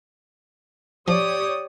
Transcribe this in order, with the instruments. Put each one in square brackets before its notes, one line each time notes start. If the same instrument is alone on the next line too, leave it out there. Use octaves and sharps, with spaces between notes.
[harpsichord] F3 [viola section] G4 C#5 [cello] D5 [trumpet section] D#6